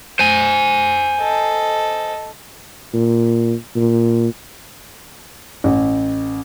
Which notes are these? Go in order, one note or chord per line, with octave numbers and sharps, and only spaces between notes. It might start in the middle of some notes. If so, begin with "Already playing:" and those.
C5 G#5
A4 D#5
A#2
A#2
A1